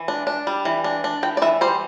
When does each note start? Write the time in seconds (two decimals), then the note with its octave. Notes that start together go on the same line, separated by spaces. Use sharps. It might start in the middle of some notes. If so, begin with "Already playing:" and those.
Already playing: E3
0.08 D4
0.27 D4
0.47 G3
0.65 E3
0.84 D4
1.04 D4
1.23 E3 G5
1.37 D5
1.42 E3 E5
1.61 G3 C5